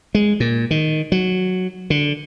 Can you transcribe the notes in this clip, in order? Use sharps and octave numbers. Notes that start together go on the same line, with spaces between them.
G#3
A#2
D#3
F#3
D3